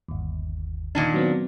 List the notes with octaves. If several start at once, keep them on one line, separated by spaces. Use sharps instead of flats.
G1 D#2
A#2 D#3 D4
F#3 B3 C4